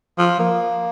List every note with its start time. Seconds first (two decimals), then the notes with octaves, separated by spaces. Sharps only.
0.18 F3
0.40 A#3